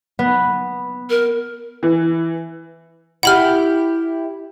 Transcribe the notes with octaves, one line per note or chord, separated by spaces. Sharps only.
B3
A#4
E3
E4 G4 F#5 B5 F6